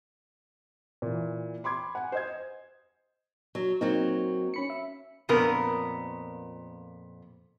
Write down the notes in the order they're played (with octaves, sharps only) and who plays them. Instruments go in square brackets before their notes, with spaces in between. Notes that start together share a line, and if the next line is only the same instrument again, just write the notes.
[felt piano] A#2 E3
B5 C6 D6 G#6
F#5 G#5
C5 D#5 G#6
[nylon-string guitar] F#3
[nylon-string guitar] F#3 A#3 C4 [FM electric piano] D#4
[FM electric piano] C#4 B5 C#7
E5
[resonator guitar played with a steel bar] F2 A#2 B3 A#4